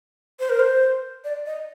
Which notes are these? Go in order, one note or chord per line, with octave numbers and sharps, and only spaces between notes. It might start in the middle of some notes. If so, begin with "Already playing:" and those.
C5
A#4
C5
D5
D#5